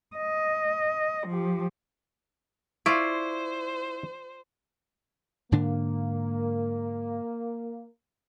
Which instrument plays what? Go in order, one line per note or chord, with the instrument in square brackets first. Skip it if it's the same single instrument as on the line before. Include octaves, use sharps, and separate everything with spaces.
[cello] D#5
F3 G4
[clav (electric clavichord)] E4 [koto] F4 D5 [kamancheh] C5 [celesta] C#6
[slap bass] G#2 D3 D4 [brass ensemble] A#3